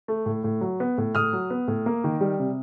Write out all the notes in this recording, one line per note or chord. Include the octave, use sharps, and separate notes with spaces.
A3
A2
A2
F#3
B3
A2
A2 D#6 F6
F#3
B3
A2
A#3
D#3
G3
C3